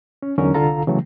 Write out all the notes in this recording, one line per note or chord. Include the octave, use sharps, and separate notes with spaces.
C#4
E2 D3 F#3 C#4 D#4 A#4
C2 D3 F4 A4 F5 A#5
C#3 E3 F#3 A3